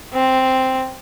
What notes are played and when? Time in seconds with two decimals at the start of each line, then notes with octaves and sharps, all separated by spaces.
0.13 C4